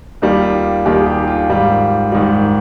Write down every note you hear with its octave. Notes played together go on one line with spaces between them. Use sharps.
D#2 D#3 G3 F4
F4
D#2 D#3 G3 G4
G#4
G4
F4
G#2 D#3 G3 F4
G#2 D#3 G3